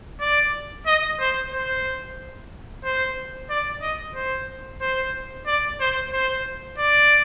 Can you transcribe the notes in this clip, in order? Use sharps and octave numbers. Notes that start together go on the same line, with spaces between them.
D5
D#5
C5
C5
C5
D5
D#5
C5
C5
D5
C5
C5
D5